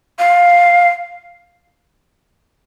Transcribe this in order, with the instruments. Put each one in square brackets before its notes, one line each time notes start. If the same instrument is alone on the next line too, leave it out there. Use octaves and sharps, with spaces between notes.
[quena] F5